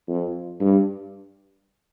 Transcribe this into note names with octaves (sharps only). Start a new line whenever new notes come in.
F2
G2